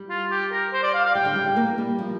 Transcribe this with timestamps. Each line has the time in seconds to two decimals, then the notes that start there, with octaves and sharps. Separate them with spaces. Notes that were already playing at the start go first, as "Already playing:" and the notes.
Already playing: G3
0.10 F4
0.31 G4
0.52 A#4
0.73 C5
0.83 D5
0.94 F5
1.04 F5
1.15 G3 G5
1.25 D3
1.36 G3
1.46 G3
1.56 A#3
1.78 G3
1.99 F3